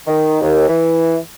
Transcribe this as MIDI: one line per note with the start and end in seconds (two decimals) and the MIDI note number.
0.07 0.36 51
0.41 0.68 39
0.68 1.16 52